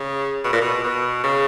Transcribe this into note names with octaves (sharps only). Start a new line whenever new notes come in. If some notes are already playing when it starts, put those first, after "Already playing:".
Already playing: C#3
B2
A#2
B2
B2
C#3